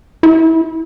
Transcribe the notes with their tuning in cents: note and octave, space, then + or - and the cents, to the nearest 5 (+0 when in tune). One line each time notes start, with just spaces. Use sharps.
E4 -25